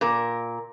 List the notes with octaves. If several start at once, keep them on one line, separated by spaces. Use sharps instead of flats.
A#2 A#4